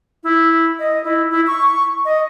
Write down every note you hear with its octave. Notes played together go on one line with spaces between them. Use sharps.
E4
D#5
E4
E4
C#6
D#5